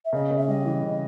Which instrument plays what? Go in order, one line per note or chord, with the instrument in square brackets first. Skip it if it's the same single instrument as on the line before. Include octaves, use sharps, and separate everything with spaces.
[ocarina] E5
[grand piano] C#3 [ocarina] D#5
[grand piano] C#3
[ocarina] E5
[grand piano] G3 [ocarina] D#5
[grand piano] E3
C#3